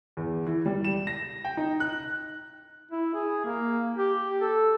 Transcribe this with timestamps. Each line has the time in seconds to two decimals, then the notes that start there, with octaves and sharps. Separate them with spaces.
0.17 E2
0.46 E3
0.66 G3
0.84 E7
1.07 A#6
1.45 G5
1.57 D#4
1.80 F#6
2.91 E4
3.14 G#4
3.45 A#3
3.97 G4
4.41 A4